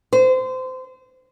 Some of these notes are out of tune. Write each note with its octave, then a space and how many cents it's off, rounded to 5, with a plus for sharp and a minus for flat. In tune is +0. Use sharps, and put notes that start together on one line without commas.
C5 -25